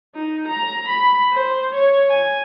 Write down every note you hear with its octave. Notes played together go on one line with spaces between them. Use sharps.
D#4
A#5
B5
C5
C#5
G#5